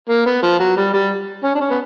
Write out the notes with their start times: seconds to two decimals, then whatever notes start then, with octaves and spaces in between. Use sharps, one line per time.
0.09 A#3
0.26 B3
0.43 F3
0.60 F#3
0.77 G3
0.93 G3
1.44 C#4
1.55 D4
1.61 C#4
1.70 B3